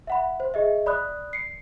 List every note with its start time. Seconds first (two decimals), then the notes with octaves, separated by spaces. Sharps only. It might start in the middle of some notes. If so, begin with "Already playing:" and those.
0.07 E5 F#5 B5
0.40 C5
0.54 G#4 D#5 E5
0.86 D5 B5 D#6 F#6
1.33 C7 C#7